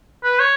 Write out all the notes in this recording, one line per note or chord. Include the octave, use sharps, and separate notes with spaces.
B4
C#5